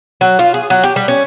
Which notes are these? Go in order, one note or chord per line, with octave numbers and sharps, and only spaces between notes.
F#3
F4
G#4
F#3
G4
G3
C#4